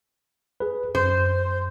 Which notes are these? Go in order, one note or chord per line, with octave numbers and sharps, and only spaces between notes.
G#4 B4
F#2 C5